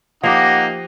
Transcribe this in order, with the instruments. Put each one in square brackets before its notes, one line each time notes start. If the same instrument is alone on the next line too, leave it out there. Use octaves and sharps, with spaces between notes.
[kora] F3 G4 [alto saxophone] A#3 [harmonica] D#4 D#5 [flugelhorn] F#5